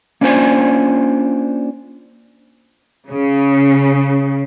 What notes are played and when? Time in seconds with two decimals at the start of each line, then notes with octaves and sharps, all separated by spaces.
0.21 A#3 C#4 D4 F4 C5 G#5
3.10 C#3